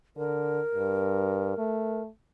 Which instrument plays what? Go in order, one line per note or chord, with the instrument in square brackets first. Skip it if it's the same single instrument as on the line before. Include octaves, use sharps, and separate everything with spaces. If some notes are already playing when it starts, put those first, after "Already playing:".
[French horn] D3 [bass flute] A#4
[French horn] G2
A3